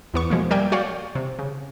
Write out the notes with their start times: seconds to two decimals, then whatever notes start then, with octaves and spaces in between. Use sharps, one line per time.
0.14 E2 B3 C#6
0.30 B2 F3 G#3 A#3
0.50 G3 A#3 D5 E5 G5 G#5
0.72 F#4 C#5 D5 F5 G5
1.15 C3
1.39 C#3